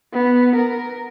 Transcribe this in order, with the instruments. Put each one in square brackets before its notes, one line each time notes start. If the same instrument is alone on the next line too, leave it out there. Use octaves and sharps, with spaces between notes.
[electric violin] B3
A#4